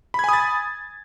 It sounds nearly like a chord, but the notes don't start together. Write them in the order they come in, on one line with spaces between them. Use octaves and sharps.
B5 G#6 G#5 D#6 A6